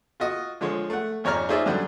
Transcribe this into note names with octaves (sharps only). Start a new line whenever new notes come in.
F4 F#4 D#5
D3 F3 G#3 C#5
A3 F#5
G#1 F2 C#5 D5 A#5 F6
D#4 F4 G#4 C5 D5 E5
F#2 D3 F#3 G3